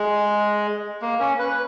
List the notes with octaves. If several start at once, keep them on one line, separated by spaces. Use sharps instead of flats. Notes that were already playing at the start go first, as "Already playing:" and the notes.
Already playing: G#3
A#3
C#4
B4